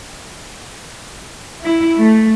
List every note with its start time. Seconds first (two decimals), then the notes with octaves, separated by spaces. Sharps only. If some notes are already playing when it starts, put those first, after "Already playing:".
1.64 E4
1.99 A3